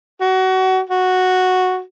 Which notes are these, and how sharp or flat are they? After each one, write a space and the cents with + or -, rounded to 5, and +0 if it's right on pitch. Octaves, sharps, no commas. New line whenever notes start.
F#4 +25
F#4 -5